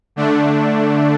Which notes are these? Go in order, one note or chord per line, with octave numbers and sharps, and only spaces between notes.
D3 A3 D4